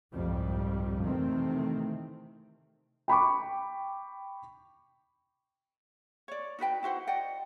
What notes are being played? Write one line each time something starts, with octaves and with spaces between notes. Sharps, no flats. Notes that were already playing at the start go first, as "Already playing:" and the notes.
C2 F2 G#2 G3
C3 D#3 E3 A3 C4
G5 B5 C#6 D6
C#5 D5
D#4 F#4 B4 G5
E4 F#4 C5 F#5
D5 D#5 F#5 G5